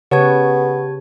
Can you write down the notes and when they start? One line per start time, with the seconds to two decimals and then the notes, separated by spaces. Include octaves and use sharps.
0.11 C#3 B3 G4 B4 C#5 A5 G#6